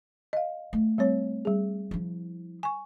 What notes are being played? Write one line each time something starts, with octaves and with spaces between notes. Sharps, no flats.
D#5 F5
A3
G3 C4 C#5
G3 G#4
F3 E4
G#5 C#6